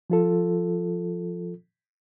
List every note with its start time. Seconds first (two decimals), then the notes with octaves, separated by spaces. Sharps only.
0.10 F3 F4 A4